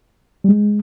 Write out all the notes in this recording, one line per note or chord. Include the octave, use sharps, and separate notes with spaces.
G3
G#3